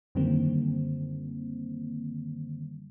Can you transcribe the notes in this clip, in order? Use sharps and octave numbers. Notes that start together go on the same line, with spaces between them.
F#2 D3 D#3 G3 A#3 C4